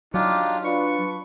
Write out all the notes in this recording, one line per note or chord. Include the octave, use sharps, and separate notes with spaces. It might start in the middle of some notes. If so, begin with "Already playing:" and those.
F#3 D4 D#4 F4 G4
D4 F4 B4 C#6